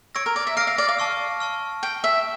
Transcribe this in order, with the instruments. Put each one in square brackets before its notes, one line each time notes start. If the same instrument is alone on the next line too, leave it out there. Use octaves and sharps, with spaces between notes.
[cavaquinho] C#5 [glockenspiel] E6 A#6 D7
[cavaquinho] A#4
D5
E5
[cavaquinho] F5 [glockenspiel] E6 A#6 D7
[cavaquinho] F5
D5
F5
[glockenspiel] A5 C#6 F6
A5 C#6 F6
[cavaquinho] G5 [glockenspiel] C#6 F6 C#7 G7
[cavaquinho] E5